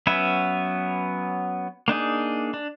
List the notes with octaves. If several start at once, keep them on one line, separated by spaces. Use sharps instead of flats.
F#3 B3 C#4 B4 E5
A#3 D4 D#4 G#4
D4